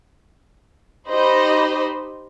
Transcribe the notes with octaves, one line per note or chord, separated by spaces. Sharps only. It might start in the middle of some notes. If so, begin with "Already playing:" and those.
D#4 G4 C5 D#5 B5